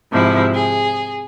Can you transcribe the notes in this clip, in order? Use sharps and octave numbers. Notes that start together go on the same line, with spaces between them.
G#2 C3 F3 E4
G#4